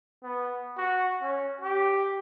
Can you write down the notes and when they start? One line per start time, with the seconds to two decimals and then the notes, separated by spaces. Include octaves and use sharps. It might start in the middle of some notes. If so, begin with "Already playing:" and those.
0.23 B3
0.77 F#4
1.22 C#4
1.61 G4